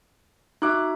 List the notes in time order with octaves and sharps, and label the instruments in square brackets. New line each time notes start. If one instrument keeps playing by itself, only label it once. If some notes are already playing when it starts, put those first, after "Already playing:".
[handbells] D#4 F#4 E5 [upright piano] D6 F#6